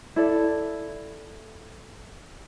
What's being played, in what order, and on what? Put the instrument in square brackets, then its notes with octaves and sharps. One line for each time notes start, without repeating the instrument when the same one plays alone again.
[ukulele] E4 A4 D5